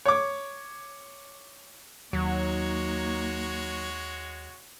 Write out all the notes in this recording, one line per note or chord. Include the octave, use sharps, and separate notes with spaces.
C#5 D6
D#2 F#3 G#3 A#3 D#4 F#4 C#5